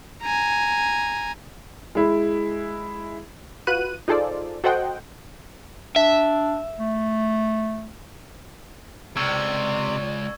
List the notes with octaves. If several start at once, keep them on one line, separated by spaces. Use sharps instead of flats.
G#5 A#5
G#3 E4
F4 F#4 B4 F#6 D#7
D#4 F4 G#4 A4 C5 D5
F#4 A4 C5 D#5 F#5 G5
D4 E5
A3
C#2 C3 D5 C#6 E6 G#6